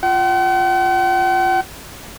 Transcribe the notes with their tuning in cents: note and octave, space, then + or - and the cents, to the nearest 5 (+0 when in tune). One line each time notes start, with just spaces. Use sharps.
F4 +0 F#5 +45